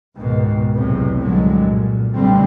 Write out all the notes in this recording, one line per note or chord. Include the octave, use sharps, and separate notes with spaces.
C#2 G#2 B2 D#3
B1 E2 A2 C3
C2 G2 A#2 D3 F#3 G#3
A#2
B1 A2 D3 G3 A3 C4